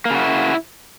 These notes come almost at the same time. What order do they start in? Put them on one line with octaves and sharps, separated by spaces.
A#3 C#3 F#4 E4